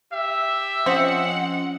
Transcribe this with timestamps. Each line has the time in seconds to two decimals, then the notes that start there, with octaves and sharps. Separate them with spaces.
0.12 G4 E5
0.86 F3 C4 C#4 D#5 F#5